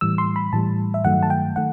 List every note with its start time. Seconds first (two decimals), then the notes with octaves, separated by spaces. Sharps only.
0.01 A2 E3 G3 E6
0.18 C6
0.36 B5
0.53 A2 E3 G3 A5
0.94 E5
1.05 G2 D#3 F#3 A3 F#5
1.23 A5
1.30 G5
1.56 D#3 A3 F#5